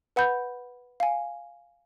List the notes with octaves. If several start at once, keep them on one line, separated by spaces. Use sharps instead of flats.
B4 F#5 B5 G6
F5 G#5